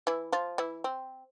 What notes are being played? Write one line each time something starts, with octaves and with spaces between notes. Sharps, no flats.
E3 E4
F3 F4
E3 E4
C4